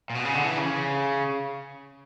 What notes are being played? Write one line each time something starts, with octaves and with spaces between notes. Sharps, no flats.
A#2
B2
C#3
D3
E3
C#3